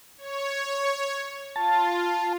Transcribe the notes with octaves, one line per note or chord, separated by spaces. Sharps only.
C#5
F4 A5